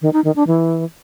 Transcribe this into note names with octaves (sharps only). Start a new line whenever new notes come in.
D#3
D#4
D#3
D4
E3